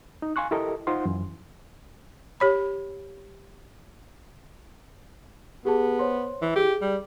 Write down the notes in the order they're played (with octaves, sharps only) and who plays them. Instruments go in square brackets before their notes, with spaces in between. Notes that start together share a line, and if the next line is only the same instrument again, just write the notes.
[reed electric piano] D#4
F5 G#5 C6 C#6 F#6
E4 G4 A4 A#4 D#5
D#4 F4 C5 F5 F#5 C6
F#2 E3
[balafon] G4 C#5 B5
[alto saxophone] B3 [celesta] G4 G#4 A5
[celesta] C5 C#5 C6
[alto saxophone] E3
[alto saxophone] G4 [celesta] G#4
[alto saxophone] G3